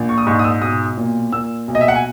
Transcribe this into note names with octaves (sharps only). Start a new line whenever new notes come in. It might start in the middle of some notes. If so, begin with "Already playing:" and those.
Already playing: A#1
C#6
D#6
G#2 C#6
D#6
E6
B1 D#6
A#2
A#2 E6
B1
D#5
E5
F#5
G#5